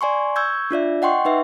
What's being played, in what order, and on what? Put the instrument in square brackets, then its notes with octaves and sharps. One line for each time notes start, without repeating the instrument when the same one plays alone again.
[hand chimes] D5 G#5 C6 C#6
C#6 E6 G6 G#6
D4 F4 D5 E5
D#5 F#5 G5 C6 C#6
D#4 B4 E5